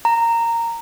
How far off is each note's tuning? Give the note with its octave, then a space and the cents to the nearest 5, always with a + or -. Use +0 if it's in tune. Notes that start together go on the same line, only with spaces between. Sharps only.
A#5 -10